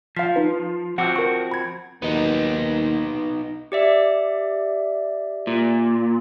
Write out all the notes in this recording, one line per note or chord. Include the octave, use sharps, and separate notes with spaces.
F3 F5 B6
D#4 B4
F3 C4 F#4 F#5 D6 E6
A#4 C#6
B5 G#6
D#2 B3 D#4
G4 D5 E5
A#2